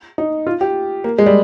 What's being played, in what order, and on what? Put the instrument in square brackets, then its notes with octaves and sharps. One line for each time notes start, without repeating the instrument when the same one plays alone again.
[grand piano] D#4
F4
G4
A#3
G#3
G3